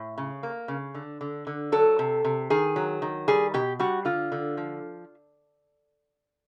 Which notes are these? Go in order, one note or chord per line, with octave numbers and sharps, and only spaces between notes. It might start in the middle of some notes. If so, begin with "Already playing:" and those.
Already playing: A2
C#3
A#3
C#3
D3
D3
D3
F#3 A4
C3
C3
D#3 G#4
F#3
D#3
G3 G#4
B2 G4
G3 F#4
D3 F4
D3
F3